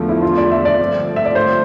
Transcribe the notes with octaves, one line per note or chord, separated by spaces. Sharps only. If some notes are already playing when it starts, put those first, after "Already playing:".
Already playing: E2 D3 F3 A3
E4
F4
D5
E5
D5
G2 D3 F3 A3 C4
E5
D5
C5